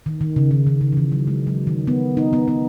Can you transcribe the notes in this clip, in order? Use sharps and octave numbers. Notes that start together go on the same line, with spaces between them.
D#3
D#3
C#3
D#3
D#3
C#3
E3
D#3
F#3
G#3
F#3
D#3
B3
D#4
B3
B3